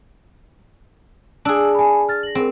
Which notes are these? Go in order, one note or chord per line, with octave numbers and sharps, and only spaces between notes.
D4 G#4 E6 D7 F#7
G#5 B5
F6 A6
A#6 F#7
C4 G#4 A#4